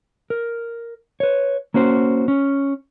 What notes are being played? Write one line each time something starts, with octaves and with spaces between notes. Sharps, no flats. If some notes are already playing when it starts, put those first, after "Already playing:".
A#4
B4 C#5
A#3 C#4 F#4 C5
C#4